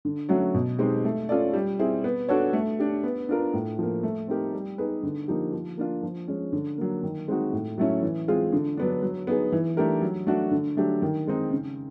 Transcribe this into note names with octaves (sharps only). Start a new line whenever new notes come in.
D3
F#3 A3 C#4 F#4
B2
G#3 C4 D#4 G4
A3
C#4 F4 A4 D5
G3
C4 E4 G#4
B3
D4 F#4 A4 C#5
A3
D4 G4
B3
D4 F4 A#4
A2
F3 A#3
A3
C4 D#4 G4 A#4
G3
B3 D#4 G#4 B4
D3
F3 A#3 D#4 G4
F3
A#3 D4 F4
F3
G#3 C#4
D3
F#3 A#3
D#3
G#3 C4 D#4 F#4
A2
F#3 A3 C#4 E4
E3
G#3 C4 F4 G#4
D3
F#3 B3 D4
F#3
B3 D#4 G#4
E3
A3 D4 G4 A#4
F#3
A3 D4 F#4
D3
F#3 A3 D4 G4
D#3
G#3 C4 D#4
C#3